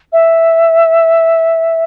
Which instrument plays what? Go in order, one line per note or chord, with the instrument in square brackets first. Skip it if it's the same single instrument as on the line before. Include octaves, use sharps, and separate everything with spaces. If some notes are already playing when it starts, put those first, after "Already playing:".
[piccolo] E5